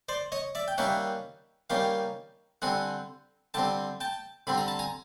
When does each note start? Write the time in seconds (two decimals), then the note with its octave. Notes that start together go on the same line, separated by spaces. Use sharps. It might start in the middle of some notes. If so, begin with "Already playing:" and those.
0.09 C5 D5
0.32 C#5 D#5
0.55 D5 E5
0.68 G5
0.78 D#3 G3 A#3 C#4 E5 F#5
1.70 D#3 G3 A#3 C#4 F5 G5
2.62 D3 G3 C4 F#5 G#5
3.54 D3 G3 C4 G5 A5
4.01 G5 A5
4.47 D3 G3 C4 B5
4.58 A#5
4.68 A5
4.79 G#5 A#5